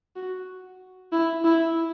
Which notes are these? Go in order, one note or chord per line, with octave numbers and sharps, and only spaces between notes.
F#4
E4
E4